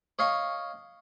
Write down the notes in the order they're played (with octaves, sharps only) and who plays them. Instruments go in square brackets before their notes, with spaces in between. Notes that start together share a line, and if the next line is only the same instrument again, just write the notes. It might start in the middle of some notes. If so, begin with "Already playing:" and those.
[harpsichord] C#5 D#5 F5 C#6